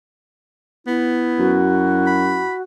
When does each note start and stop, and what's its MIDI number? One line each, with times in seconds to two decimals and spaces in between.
0.87 1.63 59
0.87 2.57 64
1.39 2.43 42
1.39 2.62 66
2.07 2.53 83